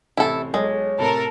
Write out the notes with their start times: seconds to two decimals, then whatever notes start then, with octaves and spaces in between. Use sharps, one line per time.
0.17 A1 C3 E4 A4
0.54 B1 G#3 A4 C#5
0.98 A2 C3 A4 A#4 A5 B5